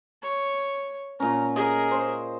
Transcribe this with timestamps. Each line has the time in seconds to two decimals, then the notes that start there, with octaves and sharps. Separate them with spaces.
0.22 C#5
1.20 A#2 C#4 A#5
1.56 G#4 A#4 D#5
1.92 C5